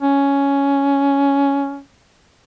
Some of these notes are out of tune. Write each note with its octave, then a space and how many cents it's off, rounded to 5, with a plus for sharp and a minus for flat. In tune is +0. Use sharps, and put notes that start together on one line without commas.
C#4 +10